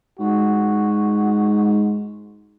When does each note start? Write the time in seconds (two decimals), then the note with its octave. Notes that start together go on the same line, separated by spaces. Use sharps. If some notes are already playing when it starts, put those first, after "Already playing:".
0.19 G#2 F#4